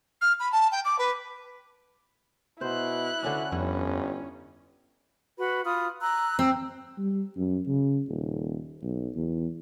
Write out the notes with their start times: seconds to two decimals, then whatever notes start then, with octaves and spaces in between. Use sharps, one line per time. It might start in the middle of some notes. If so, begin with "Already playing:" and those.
0.21 F6
0.40 B5
0.52 A5
0.71 G5
0.85 D6
0.98 B4
2.61 B2 E4 C5 F#6
3.23 D2 D3 C#4 D4
3.52 G1 F2 C#4 E4
5.38 F#4 B4 B5
5.65 F4 B5 D#6
6.01 A#5 E6 F#6
6.39 C4 E6
6.98 G3
7.37 F#2
7.67 C#3
8.09 D#1
8.82 B1
9.16 E2